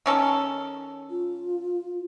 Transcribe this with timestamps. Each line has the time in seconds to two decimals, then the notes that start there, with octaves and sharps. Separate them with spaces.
0.06 D#3 C#4 A4
1.10 F4